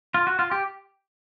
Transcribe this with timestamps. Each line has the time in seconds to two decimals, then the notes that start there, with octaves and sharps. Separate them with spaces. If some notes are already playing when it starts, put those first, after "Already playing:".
0.14 F4
0.27 F#4
0.39 F4
0.51 G4